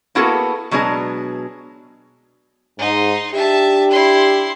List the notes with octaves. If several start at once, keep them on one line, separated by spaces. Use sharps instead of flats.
A#3 B3 E4 F#4 G#4 A4
B2 F#3 G#3 D4 G#5
G#2 D#4 C6
D4 G4 E5 A5
E4 C6